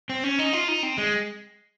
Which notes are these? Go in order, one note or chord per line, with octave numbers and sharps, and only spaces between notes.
C4
C#4
D#4
F4
D#4
C4
G#3